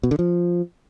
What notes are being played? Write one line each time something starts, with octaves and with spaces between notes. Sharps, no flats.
B2
D3
F3